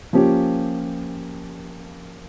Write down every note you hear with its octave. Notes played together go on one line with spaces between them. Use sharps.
F3 A#3 C#4 G4